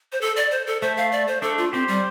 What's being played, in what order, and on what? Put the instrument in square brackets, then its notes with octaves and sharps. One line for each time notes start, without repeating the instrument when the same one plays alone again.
[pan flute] C5
A4
D5
C5
A4
[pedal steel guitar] A3 [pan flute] C5
[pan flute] F5
D5
C5
[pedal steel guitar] A3 D4 [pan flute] A4
[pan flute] F4
[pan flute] C4 [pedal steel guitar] G4 C5
[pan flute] G3